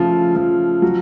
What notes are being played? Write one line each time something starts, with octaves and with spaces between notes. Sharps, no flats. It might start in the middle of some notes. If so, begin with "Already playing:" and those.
Already playing: C#3 F3 A3
F3
F#3